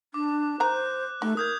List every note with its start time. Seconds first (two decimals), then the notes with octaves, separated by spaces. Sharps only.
0.14 D4 D6
0.60 D#3 C5 A#5 F#6
1.22 A3 D#4 G4
1.37 A#4 D#6 G6 G#6